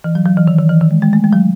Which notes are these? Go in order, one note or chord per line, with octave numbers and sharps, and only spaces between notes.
E3
F#3
F#3
E3
D#3
D#3
E3
D#3
G#3
G#3
A3
G#3
F#3